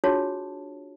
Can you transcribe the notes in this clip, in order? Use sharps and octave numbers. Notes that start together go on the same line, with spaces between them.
D4 F4 F#4 G#4 C#5 A5